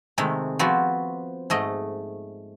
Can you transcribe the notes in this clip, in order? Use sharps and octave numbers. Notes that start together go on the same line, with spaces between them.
C3 D#3 G#3 A3
F3 B3 C4 F#4
G#2 A3 D#5